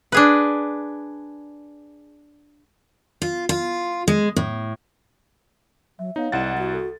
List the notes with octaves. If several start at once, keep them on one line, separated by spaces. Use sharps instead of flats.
D4 G#4 B4
F4
F4
G#3
A2
F#3 E5
B3 D#4 C#5 F5
C2 G3 E4 D#5 F#5 A6 E7
F#4
A4